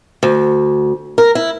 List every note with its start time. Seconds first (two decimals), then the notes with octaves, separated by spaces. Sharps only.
0.23 D2
1.18 A#4
1.35 E4